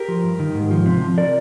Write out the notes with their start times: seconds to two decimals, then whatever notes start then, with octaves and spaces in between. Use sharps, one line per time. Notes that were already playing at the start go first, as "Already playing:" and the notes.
Already playing: G4 A#4
0.08 F3
0.24 G2
0.40 D#3
0.55 G#2
0.71 F3
0.86 C3
1.02 F3
1.18 A#4 D5